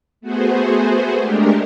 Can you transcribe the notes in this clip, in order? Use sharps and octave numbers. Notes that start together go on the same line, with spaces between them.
A3 B3 F#4 G#4 C5
G#3 A3 D4 G4 A#4